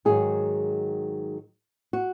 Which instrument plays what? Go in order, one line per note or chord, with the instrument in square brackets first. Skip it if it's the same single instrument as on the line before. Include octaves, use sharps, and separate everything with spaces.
[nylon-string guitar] G#2 D#3 F#3 G#4
F#4